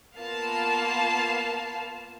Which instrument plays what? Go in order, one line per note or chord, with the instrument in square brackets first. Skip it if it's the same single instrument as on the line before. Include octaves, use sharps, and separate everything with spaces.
[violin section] A#3 B3 F4 F5 A5